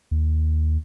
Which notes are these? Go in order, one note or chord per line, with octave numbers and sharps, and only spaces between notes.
D#2